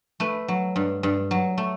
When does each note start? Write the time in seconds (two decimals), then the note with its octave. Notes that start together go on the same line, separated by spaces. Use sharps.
0.20 A3 B4
0.48 F#3
0.76 G2
1.03 G2
1.31 F#3
1.58 A3